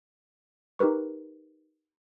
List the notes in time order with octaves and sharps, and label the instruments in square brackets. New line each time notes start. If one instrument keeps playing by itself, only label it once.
[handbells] D#4 G4 A#4 B4 C#6